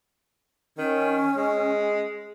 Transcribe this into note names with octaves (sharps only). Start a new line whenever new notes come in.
D#3 C#4
G#3